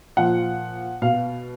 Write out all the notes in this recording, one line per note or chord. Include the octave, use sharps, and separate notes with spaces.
A#2 F3 F#5
B2 F5